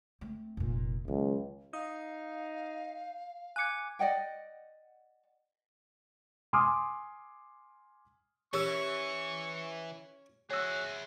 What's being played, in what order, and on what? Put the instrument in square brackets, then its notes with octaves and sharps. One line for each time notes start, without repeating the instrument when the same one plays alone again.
[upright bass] A3 C4
F1 A#2
[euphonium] C#2 [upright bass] D#3 F#3
[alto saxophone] D#4 [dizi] F5 [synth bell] D#6
[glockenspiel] G#5 D6 G#6 [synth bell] F#6 C#7
[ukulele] D5 D#5 F#5 G5
[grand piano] G#5 C6 D6 D#6 F6
[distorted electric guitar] E3 [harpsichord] C#4 [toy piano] G4 A#4 E6 [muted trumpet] C#6
[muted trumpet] F#4 [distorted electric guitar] G#4 E5 [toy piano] C#5 E6